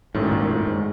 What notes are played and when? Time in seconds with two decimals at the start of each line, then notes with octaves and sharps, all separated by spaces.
0.15 G#1 F#2 A2 D#3
0.32 A#2
0.50 A2
0.67 G#2